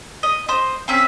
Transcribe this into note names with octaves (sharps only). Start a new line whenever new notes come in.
D#5
C5 D#5
C4 C#4 E5